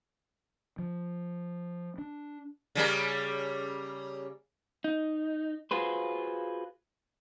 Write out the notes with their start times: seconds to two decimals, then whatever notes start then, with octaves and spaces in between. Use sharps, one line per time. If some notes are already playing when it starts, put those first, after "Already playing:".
0.79 F3
1.98 D4
2.75 C#3 G3 A#3
4.84 D#4
5.71 F4 F#4 G#4 B4 C5